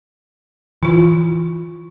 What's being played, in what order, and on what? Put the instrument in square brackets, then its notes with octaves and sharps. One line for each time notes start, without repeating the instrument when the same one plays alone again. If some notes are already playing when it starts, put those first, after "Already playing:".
[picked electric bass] E3 [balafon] E4 F4